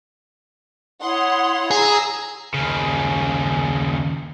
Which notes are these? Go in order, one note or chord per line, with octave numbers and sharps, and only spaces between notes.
E4 C#5 F#5 C6 D#6
G#4 A#5 E6
D#2 C#3